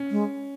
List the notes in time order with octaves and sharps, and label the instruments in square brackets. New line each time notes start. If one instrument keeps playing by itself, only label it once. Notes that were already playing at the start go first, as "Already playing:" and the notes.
Already playing: [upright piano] C#4
[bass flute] G#3